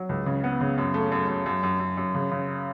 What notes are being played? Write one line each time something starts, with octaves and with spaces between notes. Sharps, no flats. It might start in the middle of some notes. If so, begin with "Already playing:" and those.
Already playing: F#3
C#2
C#3
B3
C#3
F#2
A3
F#2
F#2
F#2
F#2
F#2
F#2
C#3
C#3